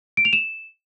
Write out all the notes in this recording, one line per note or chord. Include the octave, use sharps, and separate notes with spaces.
D7
F7
E7